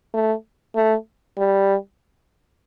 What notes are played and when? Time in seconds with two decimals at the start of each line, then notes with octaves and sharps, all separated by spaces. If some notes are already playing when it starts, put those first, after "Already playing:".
0.14 A3
0.75 A3
1.37 G3